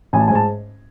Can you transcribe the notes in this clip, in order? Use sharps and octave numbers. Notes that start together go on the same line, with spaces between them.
A1 G#5
A5
G#2 G#5
A5